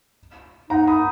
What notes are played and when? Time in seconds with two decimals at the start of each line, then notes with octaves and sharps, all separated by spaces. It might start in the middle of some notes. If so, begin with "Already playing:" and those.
0.70 D#4 F#5 A#5
0.88 B5 D#6